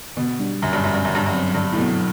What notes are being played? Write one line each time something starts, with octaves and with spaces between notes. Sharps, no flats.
B2 D3
G3 D4
F#2 D3
G2
F#2 G3 D4
G2
F#2 D3
G2
F#2
F#3 C4
G2 D3
A2
B2 F#3 C4